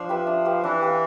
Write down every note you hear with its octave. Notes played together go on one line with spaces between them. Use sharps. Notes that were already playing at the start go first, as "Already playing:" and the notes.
Already playing: F3 D4
G4 B4 E5
D4
G4 B4 F5
E3 D4
G4 B4 F5